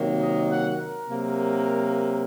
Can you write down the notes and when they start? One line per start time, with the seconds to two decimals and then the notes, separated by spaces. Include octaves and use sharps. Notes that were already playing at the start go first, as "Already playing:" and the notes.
Already playing: C3 D#3 F#3 A#3
0.22 D#5
0.50 F#5
0.79 A#4
1.07 C3 F#3 A#3